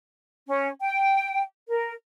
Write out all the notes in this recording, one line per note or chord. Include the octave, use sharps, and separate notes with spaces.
C#4
G5
A#4